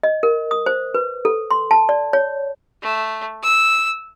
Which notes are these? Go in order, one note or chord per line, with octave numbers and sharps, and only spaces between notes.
D#5
A#4
D#6
C5
B4
A4
C6
A5
D5
C#5
A3
E6